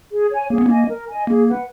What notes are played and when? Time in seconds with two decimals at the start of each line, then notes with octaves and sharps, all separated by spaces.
0.11 G#4
0.31 C#5 G#5
0.50 A#3 G#4
0.58 B3
0.66 A#3 D#5 G#5
0.88 A#4
1.08 D#5 G#5
1.27 A#3 G#4
1.47 B4 F#5